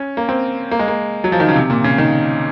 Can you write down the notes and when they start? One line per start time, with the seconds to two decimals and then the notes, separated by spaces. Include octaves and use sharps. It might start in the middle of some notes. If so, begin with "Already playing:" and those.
Already playing: C#4
0.17 A#3
0.29 C4
0.71 A#3
0.79 G#3
0.88 A#3
1.24 F#3
1.32 F3
1.40 D#3
1.48 C#3
1.56 C3
1.70 A#2
1.84 C#3
1.98 D#3